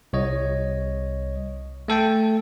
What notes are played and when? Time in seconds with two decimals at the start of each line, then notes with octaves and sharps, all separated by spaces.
0.13 C2 C#5 D#5
1.88 A3 A4 G5 A5